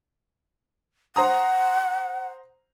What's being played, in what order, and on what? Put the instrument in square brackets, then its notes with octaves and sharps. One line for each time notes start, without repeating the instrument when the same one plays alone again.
[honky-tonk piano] C5 A#5 D#6 [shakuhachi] F#5